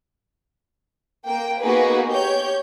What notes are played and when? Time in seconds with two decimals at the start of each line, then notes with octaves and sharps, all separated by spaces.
1.26 A#3 G5
1.61 A#3 B3 D#4 F#4 G#4 B4
2.08 G4 C#5 G6